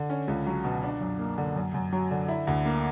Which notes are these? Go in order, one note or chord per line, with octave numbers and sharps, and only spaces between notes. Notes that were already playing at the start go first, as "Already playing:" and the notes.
Already playing: D3
C#4
C#2
F#3
B2
D4
F#2
A#3
D3
F#2
F#2
F#3
D3
E4
D2
A#3